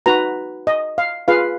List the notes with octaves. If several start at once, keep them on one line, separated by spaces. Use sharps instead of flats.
D#4 F#4 B4 A#5
D#5
F5
F4 G#4 B4 F5